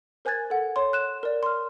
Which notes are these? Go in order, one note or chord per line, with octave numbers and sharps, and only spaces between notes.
A#4 C5 G#5 F#6 G#6 A6
A4 F#5
C#5 C6
F#6 E7
A#4 D5
C6 F6